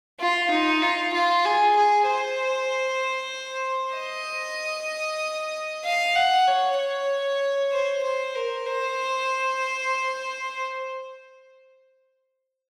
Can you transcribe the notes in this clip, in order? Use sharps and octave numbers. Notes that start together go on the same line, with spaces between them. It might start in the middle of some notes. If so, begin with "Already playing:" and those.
F4
D#4
F4
F4
G#4
G#4
C5
D#5
F5
F#5
C#5
C#5
C5
C5
A#4
C5